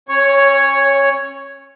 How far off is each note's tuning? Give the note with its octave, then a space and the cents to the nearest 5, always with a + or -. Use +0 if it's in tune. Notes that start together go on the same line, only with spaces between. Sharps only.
C#4 -35 C#5 +0